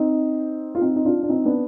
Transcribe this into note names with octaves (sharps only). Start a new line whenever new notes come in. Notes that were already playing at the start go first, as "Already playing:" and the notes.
Already playing: C4 D#4
F4
C4 D#4
D#4
D4 F4
D4
C4 D#4
B3 D4